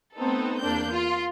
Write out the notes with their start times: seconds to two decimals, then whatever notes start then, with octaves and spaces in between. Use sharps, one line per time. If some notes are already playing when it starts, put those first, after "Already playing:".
0.15 A3 B3 C4 D#4 A4
0.61 E2 A#3 D4 G6
0.93 F4